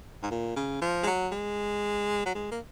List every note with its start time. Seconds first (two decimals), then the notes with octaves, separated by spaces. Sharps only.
0.23 G#2
0.31 A#2
0.56 C#3
0.82 F3
1.03 G#3
1.07 F#3
1.32 G#3
2.26 F#3
2.35 G#3
2.52 A#3